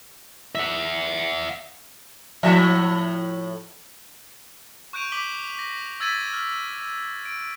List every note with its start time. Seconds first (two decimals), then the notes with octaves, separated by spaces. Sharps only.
0.55 E5 F#5
2.43 A2 F3 E5
4.93 C#6 F#6 G6 D7 D#7 F7
5.12 D6 B6 F#7 G7
5.55 D6 A#6
6.00 E6 G#6 A6 B6 D#7
6.33 F6
7.25 D7